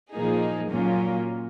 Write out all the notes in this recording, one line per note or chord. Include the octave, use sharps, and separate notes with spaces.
A#2 F3 A#3 D#4 G#4
A#2 F#3 A#3 C#4 F4